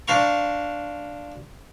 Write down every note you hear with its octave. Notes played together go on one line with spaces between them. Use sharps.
D4 C5 F5 A#5 C#6